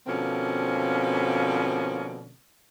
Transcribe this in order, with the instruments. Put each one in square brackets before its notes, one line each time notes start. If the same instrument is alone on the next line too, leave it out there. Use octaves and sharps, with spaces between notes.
[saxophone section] B2 D3 F3 A#3 C4 C#4